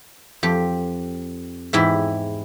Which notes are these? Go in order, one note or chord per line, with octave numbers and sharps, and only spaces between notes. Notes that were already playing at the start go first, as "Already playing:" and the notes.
F2 G4
E2 G#2 E4 G4